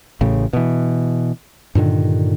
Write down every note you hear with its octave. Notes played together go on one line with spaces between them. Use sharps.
A1 A2 C#3
B2 E3
G2 A#2 D3 D#3